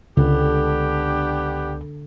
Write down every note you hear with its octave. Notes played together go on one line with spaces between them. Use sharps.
C#2 D3 B3 D4 G4